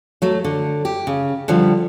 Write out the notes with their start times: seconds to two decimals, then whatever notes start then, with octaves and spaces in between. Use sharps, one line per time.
0.22 F#3 A3
0.44 D3
0.85 G4
1.07 C#3
1.48 D3 F3 G3